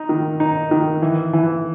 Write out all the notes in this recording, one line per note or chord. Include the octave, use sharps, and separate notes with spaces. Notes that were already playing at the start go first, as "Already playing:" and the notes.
Already playing: D#4
D#3
D#4
D#3
E3
E3